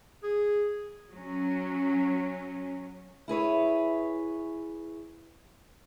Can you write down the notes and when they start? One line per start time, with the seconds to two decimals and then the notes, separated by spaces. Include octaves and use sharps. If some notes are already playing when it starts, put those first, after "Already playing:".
0.23 G#4
1.10 F#3 C#4
3.28 E4 G#4 B4 C#5